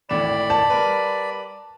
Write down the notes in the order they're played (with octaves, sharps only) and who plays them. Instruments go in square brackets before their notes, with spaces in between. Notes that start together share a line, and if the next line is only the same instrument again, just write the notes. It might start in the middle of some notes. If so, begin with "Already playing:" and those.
[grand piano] G#1 A2 E7 [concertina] D5 B5
[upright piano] A5
[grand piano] G3 A#4 B4